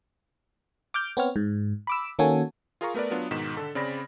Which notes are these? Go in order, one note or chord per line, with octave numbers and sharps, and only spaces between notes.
D6 F6 G6
B3 C4 C#5 F6
G#2
B5 D6 E6
D#3 A#3 C#4 F#4 A4 G#5
F4 G#4 A#4 F5 A#5 C#6
A3 B3 A#4 B4 D5
F#3 B3 D4 F4
G#2 B2 D#3 B6 E7
D3 A4
C#3 C4 D5 B5 A#6